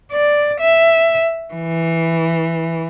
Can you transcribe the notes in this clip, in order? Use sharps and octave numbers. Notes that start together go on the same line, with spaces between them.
D5
E5
E3